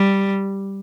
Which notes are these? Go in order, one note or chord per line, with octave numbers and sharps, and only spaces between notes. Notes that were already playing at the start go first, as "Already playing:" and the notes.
Already playing: G3